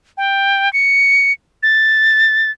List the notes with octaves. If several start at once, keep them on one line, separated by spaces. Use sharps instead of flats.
G5
C#7
A6